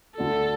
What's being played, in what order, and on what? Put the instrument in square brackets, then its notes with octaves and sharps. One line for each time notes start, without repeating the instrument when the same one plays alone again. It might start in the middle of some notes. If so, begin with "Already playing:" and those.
[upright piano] D2 D3 A3 D4 F#4 [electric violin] A4